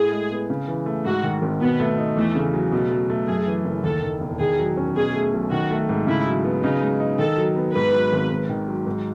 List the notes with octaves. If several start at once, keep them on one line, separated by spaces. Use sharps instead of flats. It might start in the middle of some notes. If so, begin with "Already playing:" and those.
Already playing: A2 G#4
G#3
B3
C#3
E3
A3
G#2 F#4
D#3
G#1
B2 B3
A3
D#4
E2 A3
C#3
F#3
B2 A3
F#3
A3
F#2 G#4
E3
F#1
D#2 A4
D#3
E1
D#3 G#4
F#3
C#4
B2 G#4
A3
B1
D#3 F#4
A3
G#2
C#3 E4
F#3
B3
C#3 D#4
G#3
D#4
D#3 A4
F#3
B3
G#2 B4
F#3
G#1
G#2
D#3
F#3
G#2